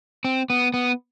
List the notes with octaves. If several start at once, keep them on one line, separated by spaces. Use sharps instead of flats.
C4
B3
B3